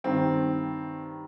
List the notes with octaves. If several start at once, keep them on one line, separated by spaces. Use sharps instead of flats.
G2 D#3 C4